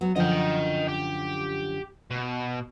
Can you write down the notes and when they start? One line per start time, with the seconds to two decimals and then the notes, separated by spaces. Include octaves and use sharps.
0.01 F#3 B3
0.16 F#2 D3 F3 D#5 G5
0.88 G4
2.11 B2